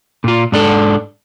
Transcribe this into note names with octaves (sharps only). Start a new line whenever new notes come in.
A#2 F4
G#2 D4 A4